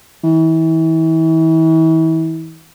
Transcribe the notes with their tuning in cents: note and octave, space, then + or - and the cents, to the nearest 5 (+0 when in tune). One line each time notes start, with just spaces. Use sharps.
E3 -35